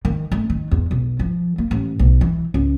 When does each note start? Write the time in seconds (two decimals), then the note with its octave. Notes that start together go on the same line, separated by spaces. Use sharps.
0.05 D#3
0.32 A3
0.50 D#3
0.71 E2
0.91 B1
1.19 F3
1.58 A#3
1.71 A1
1.99 B1
2.21 E3
2.54 C#2